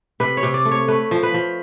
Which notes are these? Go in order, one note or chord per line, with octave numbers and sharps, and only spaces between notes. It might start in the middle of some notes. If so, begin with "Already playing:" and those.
C3 B4
C#5
C3
D5
A3
C#5
A3 B4
F3
B4
F3